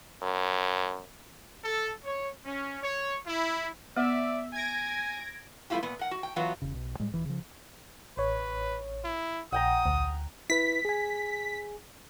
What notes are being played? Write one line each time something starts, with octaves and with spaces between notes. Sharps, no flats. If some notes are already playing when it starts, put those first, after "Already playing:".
F#2
A4
C#5
C#4
C#5
E4
B3 D5 E5
G#5 G#6 A#6 D7
G3 A3 B3 E4 F4 G4
A#2 B3
A#4 F#5
F#4
G5
E3 F#3 B3 F4 F#4
E1 C#3
B1
A2 G3 G#3
D#1 E3
C#3 F3
A1 B4 C#5
E4
A#1 F#5 G5 A#5 D#6
D2
E4 B4 B6
G#4 G#5